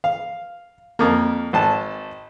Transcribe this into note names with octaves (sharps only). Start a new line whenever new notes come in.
F5
F2 A#3
G#1 A5